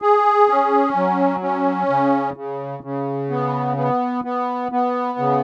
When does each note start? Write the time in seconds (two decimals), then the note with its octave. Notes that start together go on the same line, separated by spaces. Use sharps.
0.02 G#4
0.49 C#4
0.96 F#3
1.43 C#4
1.90 C#3
2.36 C#3
2.83 C#3
3.30 B3
3.77 B3
4.24 B3
4.72 B3
5.19 C#3